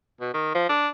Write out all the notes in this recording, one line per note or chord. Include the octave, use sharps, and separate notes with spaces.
B2
D#3
F3
D4